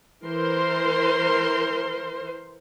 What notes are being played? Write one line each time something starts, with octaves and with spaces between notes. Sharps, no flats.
E3 A#4 C5 C6